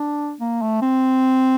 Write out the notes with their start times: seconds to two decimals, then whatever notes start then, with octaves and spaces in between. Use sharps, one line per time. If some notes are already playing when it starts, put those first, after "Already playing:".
Already playing: D4
0.41 A#3
0.62 A3
0.82 C4